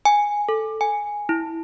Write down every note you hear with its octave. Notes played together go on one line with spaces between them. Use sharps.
G#5
A4
G#5
E4